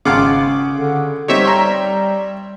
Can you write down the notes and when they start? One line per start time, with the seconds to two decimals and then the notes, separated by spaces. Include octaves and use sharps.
0.05 G#1 C#3 F4 F#5 D6
0.72 D3
1.28 G3 C4 D#4 G4 C#5 E5
1.45 G5 A#5 C6